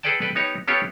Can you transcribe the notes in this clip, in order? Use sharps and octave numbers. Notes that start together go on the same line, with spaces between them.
G#4 A4 B4 D5 G5 A5
A4 B4 D5 G5
B3 D#4 G4 C#5
B3 C#4 F4 G4 A4 C#5